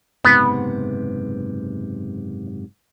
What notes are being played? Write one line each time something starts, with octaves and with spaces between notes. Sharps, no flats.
F#1 G#2 C3 B3